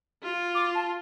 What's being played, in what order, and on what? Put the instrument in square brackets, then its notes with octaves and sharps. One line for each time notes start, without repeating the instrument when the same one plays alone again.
[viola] F4
[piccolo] D6
A5